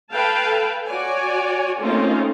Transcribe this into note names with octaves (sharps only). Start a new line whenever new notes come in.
A4 B4 F5 G5 A5
F#4 C#5 D5 G#5
A3 A#3 C4 C#4 D#4 F4